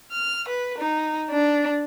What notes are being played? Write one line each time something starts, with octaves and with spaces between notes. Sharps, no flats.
F6
B4
D#4
D4